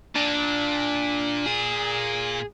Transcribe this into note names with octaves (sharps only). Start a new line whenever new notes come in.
A#2 D4
G#4